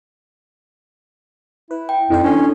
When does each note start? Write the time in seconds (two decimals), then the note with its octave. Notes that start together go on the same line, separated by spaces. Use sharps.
1.71 E4 B4
1.89 G5
2.10 F2 E3 D#4 C5
2.24 C#4 D4 A4